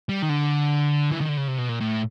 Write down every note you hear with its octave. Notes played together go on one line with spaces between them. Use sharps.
G3
D#3
D3
E3
D#3
D3
C#3
C3
B2
A#2
A2